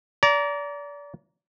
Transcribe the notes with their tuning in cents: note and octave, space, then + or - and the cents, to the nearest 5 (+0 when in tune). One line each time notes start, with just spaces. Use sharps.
D5 -30 A#5 +5